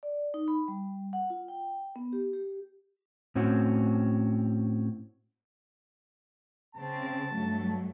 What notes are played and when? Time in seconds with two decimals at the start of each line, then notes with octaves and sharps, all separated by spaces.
0.03 D5
0.34 D#4
0.48 B5
0.68 G3
1.13 F#5
1.30 F4
1.48 G5
1.96 B3
2.13 G4
2.33 G4
3.35 A2 C4 C#4 F#4
6.75 C#3 C4 A5
7.32 G2 F#3 A3